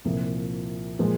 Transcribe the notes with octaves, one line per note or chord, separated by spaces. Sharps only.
C2 A#2 F3
A#2 F3 G#3